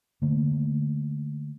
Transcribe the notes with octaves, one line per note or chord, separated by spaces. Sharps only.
D3 A3 A#3